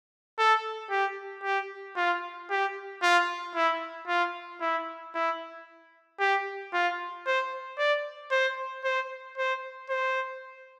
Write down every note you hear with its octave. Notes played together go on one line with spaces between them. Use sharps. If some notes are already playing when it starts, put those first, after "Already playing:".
A4
G4
G4
F4
G4
F4
E4
F4
E4
E4
G4
F4
C5
D5
C5
C5
C5
C5